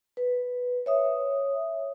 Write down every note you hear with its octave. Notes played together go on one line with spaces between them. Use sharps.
B4
C#5 E5 D#6